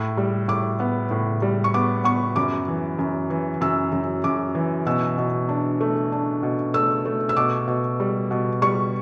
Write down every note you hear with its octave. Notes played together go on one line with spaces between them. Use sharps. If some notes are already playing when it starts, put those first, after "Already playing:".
Already playing: A2
G3
A2 D6
B3
A2
G3
C#6
B3 D6
B3 C#6
F#2 D6
E3
F#2
E3
F#2 E6
F#2
F#2 D6
E3
B2 E6
B2
D4
A3
D4
B2
A3 E6
A3
E6
B2 D6
B2
G3
B2
G3 C#6